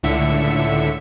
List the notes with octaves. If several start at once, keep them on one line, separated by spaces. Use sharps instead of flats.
C#2 A2 D3 E5 C#7